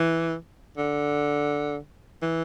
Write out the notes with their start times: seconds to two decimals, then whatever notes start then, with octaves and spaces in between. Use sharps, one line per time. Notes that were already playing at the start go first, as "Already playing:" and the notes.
Already playing: E3
0.77 D3
2.22 E3